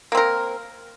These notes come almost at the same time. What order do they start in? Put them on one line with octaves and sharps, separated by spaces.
A#3 C4 A#4